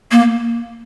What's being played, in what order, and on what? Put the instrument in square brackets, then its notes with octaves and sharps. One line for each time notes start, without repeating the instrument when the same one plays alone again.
[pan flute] A#3